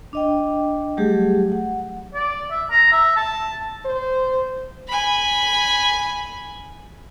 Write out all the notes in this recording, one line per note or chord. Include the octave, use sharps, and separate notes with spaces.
D4 D#5 G5
F#3 G3 A3 G4 G#4
F#5
D5
E5
A#5
E5
A5
C5
G#5 B5